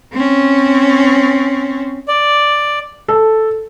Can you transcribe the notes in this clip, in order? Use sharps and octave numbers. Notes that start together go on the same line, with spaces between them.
C4 C#4
D5
A4